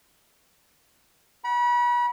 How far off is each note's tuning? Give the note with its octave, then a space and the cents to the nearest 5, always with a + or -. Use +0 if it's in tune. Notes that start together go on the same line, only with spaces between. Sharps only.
F#5 +25 B5 -35